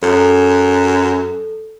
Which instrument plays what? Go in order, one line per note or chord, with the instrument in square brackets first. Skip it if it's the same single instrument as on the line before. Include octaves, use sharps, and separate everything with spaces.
[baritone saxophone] F#2 [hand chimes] A4